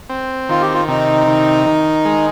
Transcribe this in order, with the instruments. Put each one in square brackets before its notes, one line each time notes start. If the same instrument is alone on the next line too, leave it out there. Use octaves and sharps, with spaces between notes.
[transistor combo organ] C4
[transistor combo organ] D#3 [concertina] F4
[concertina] G4
F4
[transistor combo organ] C3 [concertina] D#4
[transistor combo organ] D#3
D#3
G#3